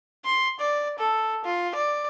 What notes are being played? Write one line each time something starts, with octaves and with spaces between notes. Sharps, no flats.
C6
D5
A4
F4
D5